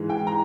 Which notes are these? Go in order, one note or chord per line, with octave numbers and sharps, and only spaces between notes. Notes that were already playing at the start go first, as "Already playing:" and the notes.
Already playing: G#2 E3 G#3
G5
A#5